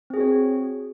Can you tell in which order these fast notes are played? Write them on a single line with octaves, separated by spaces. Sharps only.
C4 G#4 F#4 C#5